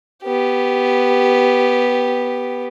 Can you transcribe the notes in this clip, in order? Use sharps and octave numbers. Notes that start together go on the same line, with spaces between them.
B3 G4